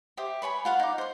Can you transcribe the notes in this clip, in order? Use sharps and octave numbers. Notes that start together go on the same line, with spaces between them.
G4 C5 E5 D#6
B4 C#5 G#5 B5
F4 F5 F#5
D#4 D6
C5 C6